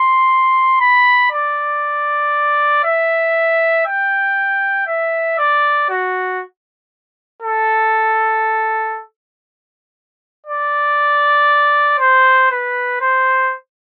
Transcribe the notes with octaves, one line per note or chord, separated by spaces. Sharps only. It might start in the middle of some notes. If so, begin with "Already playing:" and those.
Already playing: C6
B5
D5
E5
G5
E5
D5
F#4
A4
D5
C5
B4
C5